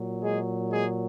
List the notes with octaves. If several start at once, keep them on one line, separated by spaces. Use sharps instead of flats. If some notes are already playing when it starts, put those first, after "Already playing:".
Already playing: A#2 F#3
G#3 G#4
G#3 G#4